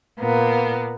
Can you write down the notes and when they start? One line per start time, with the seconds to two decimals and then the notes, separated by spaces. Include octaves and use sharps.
0.19 A#2 A#3 B3